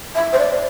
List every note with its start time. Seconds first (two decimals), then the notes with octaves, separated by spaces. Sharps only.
0.15 E5
0.33 C5
0.38 D5